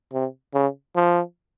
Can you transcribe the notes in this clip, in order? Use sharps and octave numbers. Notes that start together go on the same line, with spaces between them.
C3
C#3
F3